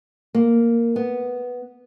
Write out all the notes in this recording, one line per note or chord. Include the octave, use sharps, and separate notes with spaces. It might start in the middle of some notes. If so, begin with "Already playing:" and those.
A#3
B3